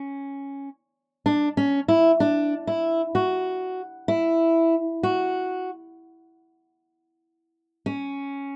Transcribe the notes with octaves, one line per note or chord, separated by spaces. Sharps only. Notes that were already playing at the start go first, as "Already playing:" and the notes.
Already playing: C#4
D4
C#4
E4
D4
E4
F#4
E4
F#4
C#4